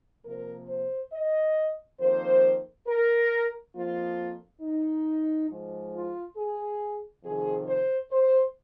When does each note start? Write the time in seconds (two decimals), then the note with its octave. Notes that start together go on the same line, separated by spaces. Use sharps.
0.25 C3 F3 A#3 A#4
0.68 C5
1.12 D#5
1.99 F2 D#3 A#3 C5
2.87 A#4
3.74 F2 F3 A#3 F4
4.61 D#4
5.48 G#2 F3 G#3
5.92 F4
6.36 G#4
7.23 F2 C3 D#3 G#4
7.68 C5
8.11 C5